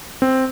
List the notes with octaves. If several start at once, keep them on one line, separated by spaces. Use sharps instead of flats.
C4